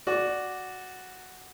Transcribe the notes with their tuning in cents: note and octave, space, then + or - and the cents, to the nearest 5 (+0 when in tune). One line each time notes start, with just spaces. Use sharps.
F#4 +0 D5 +0